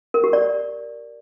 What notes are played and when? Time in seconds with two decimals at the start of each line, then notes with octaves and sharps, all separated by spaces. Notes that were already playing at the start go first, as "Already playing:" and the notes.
0.14 A#4
0.24 G4
0.33 D5